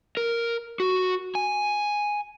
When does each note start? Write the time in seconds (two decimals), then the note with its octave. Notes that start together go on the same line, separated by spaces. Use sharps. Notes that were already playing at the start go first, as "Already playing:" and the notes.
0.17 A#4
0.80 F#4
1.35 G#5